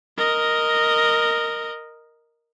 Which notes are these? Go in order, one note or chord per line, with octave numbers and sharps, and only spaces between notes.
A#4 D#5